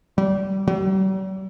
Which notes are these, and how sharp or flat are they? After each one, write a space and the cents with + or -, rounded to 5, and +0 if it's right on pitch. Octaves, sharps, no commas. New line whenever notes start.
G3 -25
G3 -45